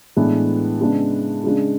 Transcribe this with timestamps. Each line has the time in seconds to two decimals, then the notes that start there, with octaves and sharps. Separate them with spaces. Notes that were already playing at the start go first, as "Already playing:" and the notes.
0.17 A2 E3 G#3 B3 D4
0.80 C#3 G#3 B3 D4
1.44 C#3 G#3 D4